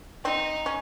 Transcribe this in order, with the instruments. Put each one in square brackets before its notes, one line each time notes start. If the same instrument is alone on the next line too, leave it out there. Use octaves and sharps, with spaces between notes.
[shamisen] C4 [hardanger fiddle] D#4
[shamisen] C#4